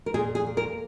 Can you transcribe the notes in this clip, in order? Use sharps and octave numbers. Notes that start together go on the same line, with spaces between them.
A#4
A#2 G#4
G#4
A#3
A#4